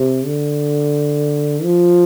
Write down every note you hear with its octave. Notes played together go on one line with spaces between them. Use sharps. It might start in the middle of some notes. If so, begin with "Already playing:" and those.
Already playing: C3
D3
F3